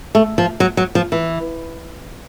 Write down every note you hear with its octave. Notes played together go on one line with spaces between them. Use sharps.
A3
F3
F#3
F#3
F3
E3